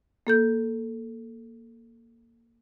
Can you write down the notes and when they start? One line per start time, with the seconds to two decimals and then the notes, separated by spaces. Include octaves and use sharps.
0.27 A#3 A4 G6